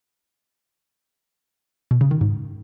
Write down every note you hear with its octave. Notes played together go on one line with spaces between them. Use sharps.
B2
C#3
D#3
G#2